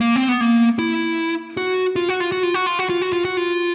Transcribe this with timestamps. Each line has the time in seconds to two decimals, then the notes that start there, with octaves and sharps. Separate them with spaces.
0.01 A#3
0.16 C4
0.29 B3
0.41 A#3
0.79 E4
1.57 F#4
1.96 F4
2.09 F#4
2.20 F4
2.32 F#4
2.43 F4
2.54 F#4
2.66 F4
2.79 F#4
2.89 F4
3.02 F#4
3.13 F4
3.25 F#4
3.37 F4